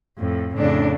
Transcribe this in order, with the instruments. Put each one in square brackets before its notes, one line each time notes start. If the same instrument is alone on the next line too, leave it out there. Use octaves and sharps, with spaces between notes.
[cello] F2 A2
[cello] F2 A2 [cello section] C#3 D4